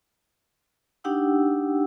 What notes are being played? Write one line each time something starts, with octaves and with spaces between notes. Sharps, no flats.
D4 D#4 G4 F#5 G5 E6